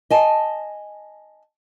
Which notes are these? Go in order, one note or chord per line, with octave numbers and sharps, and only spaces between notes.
D#5 G#5 A5